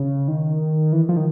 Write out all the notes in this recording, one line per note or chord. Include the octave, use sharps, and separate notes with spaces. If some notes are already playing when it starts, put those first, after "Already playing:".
Already playing: C#3
D#3
E3
F3
D#3